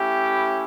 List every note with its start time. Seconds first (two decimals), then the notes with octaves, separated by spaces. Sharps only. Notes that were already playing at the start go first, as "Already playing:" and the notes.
Already playing: A3 C#4 E4 G4
0.35 B5